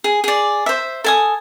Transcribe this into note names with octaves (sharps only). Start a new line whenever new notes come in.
G#4
G#4 D5
C5 E5
A4 G#5 D#6